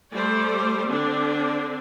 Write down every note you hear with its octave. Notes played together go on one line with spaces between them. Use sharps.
G3 A3 C5 D5
D3 C4 D4